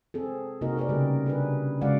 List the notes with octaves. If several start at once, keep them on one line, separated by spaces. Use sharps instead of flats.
C4 G#4 A4
C3 A#3 D#4 F#4 A#4 D#5
G#4 A#4 B4 D5
C#3 G3 A3 G4
D4 G#4 B4
C#3 G#3 F#4 D5 F5 F#5